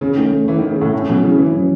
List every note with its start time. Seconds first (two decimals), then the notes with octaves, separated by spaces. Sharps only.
0.01 C#3 C#4
0.17 D#3 A3
0.33 A3
0.47 E3 A3
0.59 D#3
0.62 A3
0.70 C#3
0.77 A2 A3
0.93 A2 C#4
1.09 B2 F#3
1.24 C#3 E4
1.38 E3 C#4
1.54 F#3